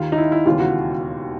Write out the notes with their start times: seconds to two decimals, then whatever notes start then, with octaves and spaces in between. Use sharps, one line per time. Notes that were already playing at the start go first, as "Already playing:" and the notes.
Already playing: D#2 D#3 F4
0.12 D#4
0.18 E4
0.32 E4
0.46 E1 D#2 C#3 E3 F4
0.60 F#4